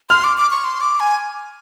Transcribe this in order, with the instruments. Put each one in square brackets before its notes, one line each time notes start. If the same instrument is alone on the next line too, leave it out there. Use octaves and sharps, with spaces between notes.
[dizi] C6 [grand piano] F6
[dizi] D6
D6
C#6
C6
D6
G#5